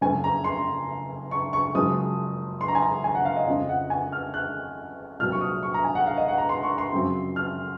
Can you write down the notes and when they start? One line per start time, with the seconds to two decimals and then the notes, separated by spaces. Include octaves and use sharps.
0.01 F#1 F2 C#3 F3 G#5
0.24 A#5
0.44 C6
1.31 C#6
1.53 C#6
1.75 F#1 F#2 F3 G#3 D#6
2.61 C6
2.68 A#5
2.75 G#5
2.82 A#5
3.04 G#5
3.15 F#5
3.25 F5
3.36 D#5
3.47 F2 C#3 F3 D#5
3.69 F#5
3.90 G#5
4.12 F6
4.34 F#6
5.19 C2 A#2 F#3 F6
5.32 C#6
5.41 D#6
5.63 C#6
5.74 A#5
5.84 G#5
5.95 F#5
6.07 F5
6.17 D#5
6.28 F#5
6.38 A#5
6.49 C6
6.63 C#6
6.78 C6
6.93 F#2 C#3 F3 C4
7.36 F6